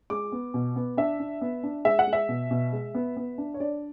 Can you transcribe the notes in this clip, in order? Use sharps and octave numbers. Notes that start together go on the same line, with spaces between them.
G#3 D6
B3
B2
B3
D4 E5
D4
B3
D4
G#3 E5
F#5
G#3
E5
B2
B2
G#3
B3
B3
D4
C#5
D4 D5